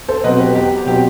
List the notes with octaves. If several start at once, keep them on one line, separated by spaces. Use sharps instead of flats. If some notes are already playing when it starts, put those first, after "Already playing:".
A4 C5
B2 F#3 C4 B4 D#5
G4 B4
E2 G4
B2 F#3 C4 G4